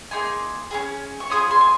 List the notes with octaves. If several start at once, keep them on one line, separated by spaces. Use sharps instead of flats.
A#3 D#4 G#4 G#5 C6
C#4 F4 G#4
C#6
C#4 F4 G#4 C6 D#6
G#5 C6
G#5